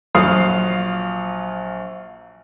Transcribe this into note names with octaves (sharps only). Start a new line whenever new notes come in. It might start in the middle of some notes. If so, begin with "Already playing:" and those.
A#1 F#3 F4 F5 D#6 C7